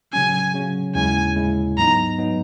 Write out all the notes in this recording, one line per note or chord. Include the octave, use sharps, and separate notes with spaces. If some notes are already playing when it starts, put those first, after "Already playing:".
C#3 F#3 C#4 G#5
C#3 F#3 C#4
D#2 C#3 G#3 C#4 E4 G#5
D#2 C#3 G#3 C#4 E4
G#2 F#3 B3 D#4 A#5
G#2 F#3 B3 D#4